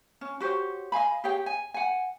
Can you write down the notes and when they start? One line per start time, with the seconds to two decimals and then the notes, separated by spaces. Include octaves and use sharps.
0.21 C#4
0.40 F#4 G4 C5 C#5
0.92 D#5 F5 G#5 B5
1.24 G4 G#4 C#5 G5
1.46 G#5
1.74 F#5 G#5